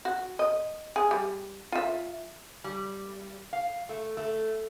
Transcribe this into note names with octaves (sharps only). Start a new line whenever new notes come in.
F#4
D#5
G#4
G3
F4 E5
G3
F5
A3
A3